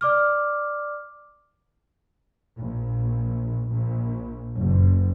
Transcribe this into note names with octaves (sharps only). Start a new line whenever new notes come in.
D5 D6 F6
A#1
A#1
F#1